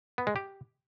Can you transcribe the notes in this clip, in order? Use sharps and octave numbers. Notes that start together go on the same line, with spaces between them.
B3
G#3
G4